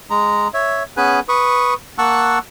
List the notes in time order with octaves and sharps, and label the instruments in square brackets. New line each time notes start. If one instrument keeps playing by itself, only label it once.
[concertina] G#3 A#5
C#5 E5
B3 C#4 G#4 B4 G#5 F#6
B4 C#6 D#6
A#3 F#5 A5 C#6 E6 F#6